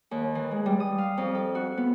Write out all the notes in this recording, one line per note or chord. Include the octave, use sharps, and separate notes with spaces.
D#2
E3
G#3
G3
D#6
F5
F2
A4
F#4
B3